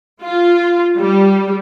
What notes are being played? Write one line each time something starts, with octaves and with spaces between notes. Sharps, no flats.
F4
G3